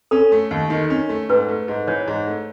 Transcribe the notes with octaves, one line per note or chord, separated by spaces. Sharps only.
C#4 A4
A3
D#2
D#3
C#4
A3
G#2 B4
A3
G#2
E3 C#5
G#2
A3